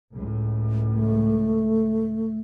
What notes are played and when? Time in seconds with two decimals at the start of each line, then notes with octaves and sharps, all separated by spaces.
0.13 C#2 A2
0.92 A3